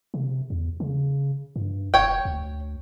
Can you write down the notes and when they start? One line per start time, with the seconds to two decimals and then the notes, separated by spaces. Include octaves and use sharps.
0.14 C3
0.50 E2
0.80 C#3
1.56 G2
1.94 E1 C#5 G5
2.25 D2